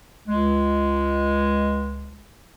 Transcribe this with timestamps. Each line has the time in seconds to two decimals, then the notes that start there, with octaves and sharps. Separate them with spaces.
0.28 C#2 G#3